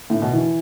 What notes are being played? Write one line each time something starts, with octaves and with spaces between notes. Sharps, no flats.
A2
B2
E3